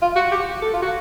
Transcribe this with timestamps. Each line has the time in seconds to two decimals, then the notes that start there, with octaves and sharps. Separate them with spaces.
0.02 F4
0.16 F#4
0.31 G4
0.62 A4
0.73 F4
0.82 F#4